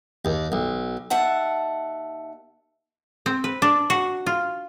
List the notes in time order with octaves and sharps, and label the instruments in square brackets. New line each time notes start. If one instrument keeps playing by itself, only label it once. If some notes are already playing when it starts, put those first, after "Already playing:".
[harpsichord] D#2
B1
[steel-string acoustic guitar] D#2 E5 F#5 A5
[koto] C4
B4
D4
F#4
F4